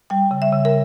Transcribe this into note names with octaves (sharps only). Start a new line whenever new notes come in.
G3 G5
C#3
E5
C#3
A#4